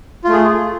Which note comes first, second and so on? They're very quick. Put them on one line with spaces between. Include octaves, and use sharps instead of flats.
F4 A3 G#4